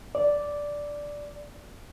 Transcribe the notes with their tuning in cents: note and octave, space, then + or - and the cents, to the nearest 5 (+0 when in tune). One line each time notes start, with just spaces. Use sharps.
D5 -5